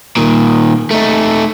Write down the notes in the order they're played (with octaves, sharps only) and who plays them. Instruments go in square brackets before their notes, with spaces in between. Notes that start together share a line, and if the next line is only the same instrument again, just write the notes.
[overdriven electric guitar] A#2 D#3
A3 D#4